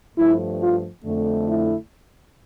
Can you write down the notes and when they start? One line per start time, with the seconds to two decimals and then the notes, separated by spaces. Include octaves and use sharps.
0.16 G2 F3 A3 E4
0.60 F4
1.04 F2 D3 A3
1.48 E4